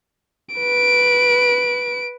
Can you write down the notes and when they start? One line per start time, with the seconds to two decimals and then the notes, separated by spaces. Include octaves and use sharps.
0.55 B4 D7